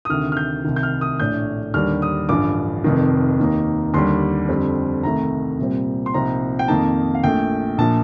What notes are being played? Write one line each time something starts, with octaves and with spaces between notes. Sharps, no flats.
D#6
D2 C3 D#3 F6
F6
G6
C2 C3 D#3
G6
F6
D#6
A#1 A2 A3 D4 G6
D#2 D3 G3 D4 F6
D#6
A1 G2 D3 F3 D6
F1 F2 D#3
D#2 D#3 A#3 D#4
D#2 D3 G3 C6
F2 D3 G3 C4
C2 C3 D#3 A3 A#5
C2 A#2 G3 C4
C6
C2 A#2 F3 C4 D#4 A#5
G5
F2 D#3 A#3 D#4 A5
F5
A#1 A#2 A3 G5
A#1 A#2 F3 A5